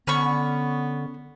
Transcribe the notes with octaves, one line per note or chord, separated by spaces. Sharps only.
D3 B3 C#4 B5 C#6